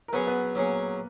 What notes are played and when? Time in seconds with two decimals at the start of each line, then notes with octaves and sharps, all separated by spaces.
0.08 A#4
0.13 F#3 B3 C#4 G#4 B4 C#5
0.27 B3 B4
0.55 F#3 A#3 C#4 G#4 A#4 C#5